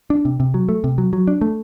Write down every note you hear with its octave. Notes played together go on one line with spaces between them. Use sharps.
D4
C3
C3
F#3
A3
C3
F#3
F#3
D4
A3